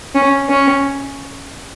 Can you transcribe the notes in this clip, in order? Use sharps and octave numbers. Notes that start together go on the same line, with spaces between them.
C#4
C#4